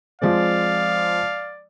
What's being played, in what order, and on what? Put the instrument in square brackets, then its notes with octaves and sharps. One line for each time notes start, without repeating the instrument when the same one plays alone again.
[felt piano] F3 G#3 C4 [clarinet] D5 [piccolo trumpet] F5